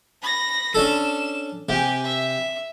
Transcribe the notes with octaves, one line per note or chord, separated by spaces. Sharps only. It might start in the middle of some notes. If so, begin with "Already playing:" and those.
B5 A#6
C#4 D4 A4 E7
C3 G4 G#5
E5